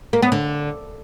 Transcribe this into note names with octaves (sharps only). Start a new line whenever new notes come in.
A#3
B3
D3